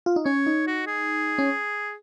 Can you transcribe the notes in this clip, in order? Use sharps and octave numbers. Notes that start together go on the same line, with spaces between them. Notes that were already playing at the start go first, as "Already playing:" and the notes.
F4
D#4
C#4 C#5
D#4
F#4
G#4
C#4